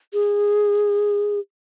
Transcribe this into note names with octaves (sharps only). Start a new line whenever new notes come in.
G#4